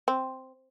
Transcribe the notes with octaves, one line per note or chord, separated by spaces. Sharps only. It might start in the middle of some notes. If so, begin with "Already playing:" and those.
C4